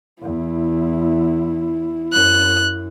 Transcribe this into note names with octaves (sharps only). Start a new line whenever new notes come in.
E2 E4
F#2 F#6